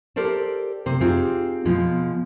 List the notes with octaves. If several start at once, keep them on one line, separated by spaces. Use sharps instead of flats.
G4 A4 A#4 C5 D5 A5
C3 C5
C4 D#4 F4 G4 G#4 C5
B2 F3 G#3 F4